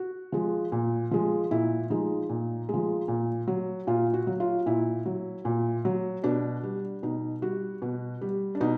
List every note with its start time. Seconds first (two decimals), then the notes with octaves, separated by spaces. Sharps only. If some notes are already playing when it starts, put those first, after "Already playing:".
Already playing: F#4
0.32 F3 G#3
0.72 A#2
1.11 F3 G#3
1.51 A#2 E4
1.90 F3 G#3 D#4
2.29 A#2
2.69 F3 G#3
3.08 A#2
3.47 F#3
3.87 A#2 F4
4.14 F#4
4.27 F#3
4.40 F4
4.66 A#2 E4
5.06 F#3
5.45 A#2
5.85 F#3
6.24 B2 D4
6.63 G3
7.03 B2 D#4
7.42 G3 F#4
7.82 B2
8.21 G3
8.55 D4
8.61 B2 D#4